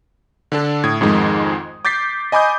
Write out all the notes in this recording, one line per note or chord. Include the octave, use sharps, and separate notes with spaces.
D3 D4 A4
A2 D#6 G#6
F2 G#2 D#3 G#3
D6 G6 A6 B6 C7
D#5 G#5 B5 D6 D#6 G6